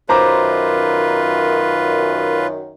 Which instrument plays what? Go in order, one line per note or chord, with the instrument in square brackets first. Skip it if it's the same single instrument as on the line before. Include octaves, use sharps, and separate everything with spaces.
[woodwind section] F#2 D#3 [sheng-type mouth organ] F4 B4 [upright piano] C5 A#5 D6